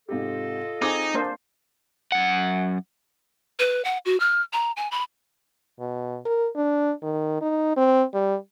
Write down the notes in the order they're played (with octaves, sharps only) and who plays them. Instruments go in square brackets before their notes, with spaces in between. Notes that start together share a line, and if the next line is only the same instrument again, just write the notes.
[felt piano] G#2 C3 G4 [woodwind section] F4 A4 D#5
[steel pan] C4 G#4 [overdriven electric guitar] D#4 [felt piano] D6 D#6 G#6
[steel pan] A#3 D4 C5
[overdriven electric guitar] F#2 F#5
[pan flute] B4
F#5
F#4
F6
A#5
G#5
B5
[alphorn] B2
A#4
D4
D#3
D#4
C4
G3